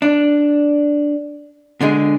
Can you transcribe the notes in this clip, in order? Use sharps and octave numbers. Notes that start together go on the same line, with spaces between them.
D4
B2 D3 G#3 G#4